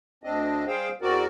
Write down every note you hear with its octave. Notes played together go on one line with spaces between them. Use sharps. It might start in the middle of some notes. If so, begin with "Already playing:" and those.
D2 C4 D4 D#5
G3 G#4 C5 F5 G5
E2 C4 F#4 A#4 D5